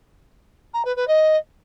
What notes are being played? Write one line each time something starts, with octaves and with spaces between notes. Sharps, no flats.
A#5
B4
B4
D#5